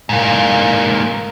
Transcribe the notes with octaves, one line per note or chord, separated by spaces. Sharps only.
G#2 A#3